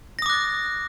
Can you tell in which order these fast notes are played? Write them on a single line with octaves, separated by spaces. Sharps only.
A#6 D#6 D6 F#6 A6